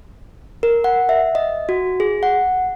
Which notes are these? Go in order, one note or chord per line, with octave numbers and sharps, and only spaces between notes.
A#4
F#5
E5
D#5
F#4
G#4
F#5